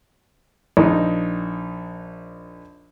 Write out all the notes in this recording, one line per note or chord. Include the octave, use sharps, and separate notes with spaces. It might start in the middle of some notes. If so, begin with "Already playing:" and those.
A#1 D#4